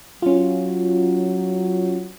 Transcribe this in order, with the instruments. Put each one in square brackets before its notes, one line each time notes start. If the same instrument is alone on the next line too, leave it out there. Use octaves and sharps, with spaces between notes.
[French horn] F#3 [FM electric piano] C#4 F4